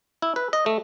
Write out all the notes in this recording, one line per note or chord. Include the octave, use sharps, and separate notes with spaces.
E4
B4
D#5
A3